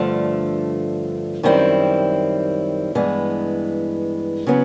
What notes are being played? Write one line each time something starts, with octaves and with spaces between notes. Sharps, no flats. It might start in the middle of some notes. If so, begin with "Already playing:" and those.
Already playing: G2 D3 F3 A3
F#2 D#3 G3 C4 E4
G2 E3 G#3 B3
C#3 F#3 B3